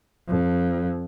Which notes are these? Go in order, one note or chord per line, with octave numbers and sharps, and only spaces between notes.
F2